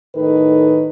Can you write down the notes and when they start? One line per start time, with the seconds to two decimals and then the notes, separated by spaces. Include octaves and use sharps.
0.16 A2 D#3 D#4 A4 B4